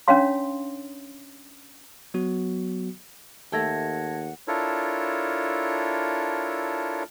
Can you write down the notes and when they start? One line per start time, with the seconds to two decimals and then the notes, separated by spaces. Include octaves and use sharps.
0.08 C#4 D4 C#5 F5 C6
2.14 F#3 B3 F#4
3.52 D#2 A3 A4 F#5 G5 A5 G#6 A#6
4.48 D4 E4 F4 A4 A#4 C#5